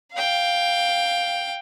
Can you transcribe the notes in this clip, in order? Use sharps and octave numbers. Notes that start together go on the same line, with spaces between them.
F5 G5